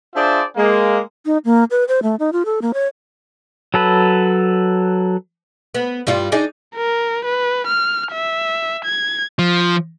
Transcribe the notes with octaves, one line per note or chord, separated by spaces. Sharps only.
D4 F4 G#4 C5 D5 E5
G#3 A#3
D#4
A#3
B4
C5
A3
D#4
F4
A4
A#3
C#5
F#3 A4 B4
B3
G2 G3 F4
D4 D#4 G#4
A#4
B4
F6
E5
G#6
F3